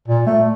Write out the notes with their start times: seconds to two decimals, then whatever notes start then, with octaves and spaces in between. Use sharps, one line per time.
0.08 A#2
0.27 A3